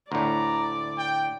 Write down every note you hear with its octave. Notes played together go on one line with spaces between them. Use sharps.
D2 A2 D5 A#5
G5